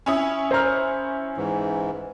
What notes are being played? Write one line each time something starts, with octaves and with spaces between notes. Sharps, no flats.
C#4 E4 D#6
C5 A#5 F6
G#2 E3